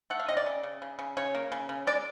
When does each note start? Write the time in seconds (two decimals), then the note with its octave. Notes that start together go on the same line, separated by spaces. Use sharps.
0.10 A3 F#5
0.20 F5
0.28 C3 D#5
0.37 D5
0.46 C#3
0.63 C#3
0.82 C#3
0.99 C#3
1.17 C#3 C#5
1.35 A#3
1.52 C#3
1.69 C#3
1.87 G#3 D5